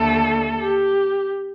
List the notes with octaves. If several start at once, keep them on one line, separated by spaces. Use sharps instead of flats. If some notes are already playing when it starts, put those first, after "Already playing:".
Already playing: D#2 D3 A3 A4
G4